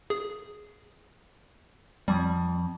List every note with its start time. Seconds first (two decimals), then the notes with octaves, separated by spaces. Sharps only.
0.10 G#4
2.08 F2 G3